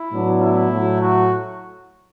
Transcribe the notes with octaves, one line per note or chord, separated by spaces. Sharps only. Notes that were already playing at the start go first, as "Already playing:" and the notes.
Already playing: E4
A2 F#3 B3 D4
E4
A2 F#3 A3
F#4